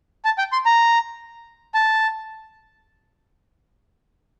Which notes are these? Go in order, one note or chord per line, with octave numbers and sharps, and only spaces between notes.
A5
G5
C6
A#5
A5